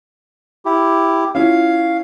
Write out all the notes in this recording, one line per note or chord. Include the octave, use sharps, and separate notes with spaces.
E4 G4
C#4 E4 F4 F5